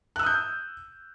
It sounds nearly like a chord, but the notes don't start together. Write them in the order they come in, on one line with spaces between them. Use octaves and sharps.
F#6 E6 D#6 G6